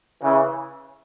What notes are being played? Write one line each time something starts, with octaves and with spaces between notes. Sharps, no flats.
C#3 E3